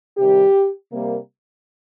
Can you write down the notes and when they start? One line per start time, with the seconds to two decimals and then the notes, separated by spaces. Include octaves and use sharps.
0.17 C3 D#3 G3 G4
0.91 C3 G3 A#3